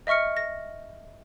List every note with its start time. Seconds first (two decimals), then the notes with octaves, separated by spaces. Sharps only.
0.07 D#5 E5 C#6 F6 C#7
0.37 A#6